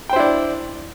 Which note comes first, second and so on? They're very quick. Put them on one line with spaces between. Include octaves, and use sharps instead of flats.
G5 C5 E4 D4